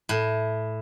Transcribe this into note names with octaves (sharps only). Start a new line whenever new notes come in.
A2